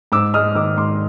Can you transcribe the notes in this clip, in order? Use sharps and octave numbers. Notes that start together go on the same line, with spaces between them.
G#2 D6 E6
G#3 D#6 F6
D#3 D6 E6
G#2 C6 D6